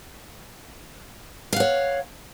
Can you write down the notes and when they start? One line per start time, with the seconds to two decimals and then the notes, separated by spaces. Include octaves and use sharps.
1.53 F5
1.56 F#5
1.60 C#5